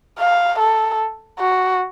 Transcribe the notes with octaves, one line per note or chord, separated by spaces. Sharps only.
F5
A4
F#4